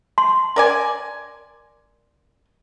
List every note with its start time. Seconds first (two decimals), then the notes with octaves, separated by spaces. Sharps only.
0.18 C6
0.56 A#4 D5 G#5